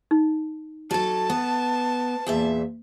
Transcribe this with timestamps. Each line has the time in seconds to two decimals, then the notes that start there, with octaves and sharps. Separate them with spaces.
0.11 D#4
0.91 F#3 A4 A5
1.30 B3
2.27 E2 A#2 E5